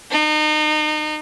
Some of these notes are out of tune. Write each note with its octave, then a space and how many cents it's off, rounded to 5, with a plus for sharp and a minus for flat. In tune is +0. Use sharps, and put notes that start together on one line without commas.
D#4 -35